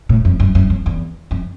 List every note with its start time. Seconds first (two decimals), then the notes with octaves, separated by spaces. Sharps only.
0.09 A2
0.25 F2
0.40 F#2
0.55 F#2
0.70 F2
0.86 E2
1.31 F2